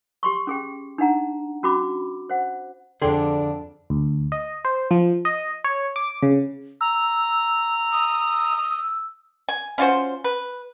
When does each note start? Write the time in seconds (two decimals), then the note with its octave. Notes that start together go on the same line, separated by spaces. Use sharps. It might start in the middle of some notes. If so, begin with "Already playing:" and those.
0.23 G4 C6 C#6
0.47 C#4 G#4 G5
0.98 D4 D#4 F#5 A#5
1.63 C#4 F#4 B5 D6
2.30 C5 F#5
3.02 F2 D3 D4 G#4 A4 G5 C6
3.90 D2
4.32 D#5
4.65 C5
4.91 F3
5.25 D#5
5.64 C#5
5.96 D6
6.23 C#3
6.81 A#5 E6
7.92 D#6
9.49 G#5
9.78 C#4 F4 F#4 C5
10.24 B4